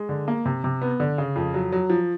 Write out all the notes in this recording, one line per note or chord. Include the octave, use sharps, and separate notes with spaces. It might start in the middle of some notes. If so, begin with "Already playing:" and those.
Already playing: G#3
D3
A#3
C3
C3
B3
D3
C#3
F2
F#3
F#3
F3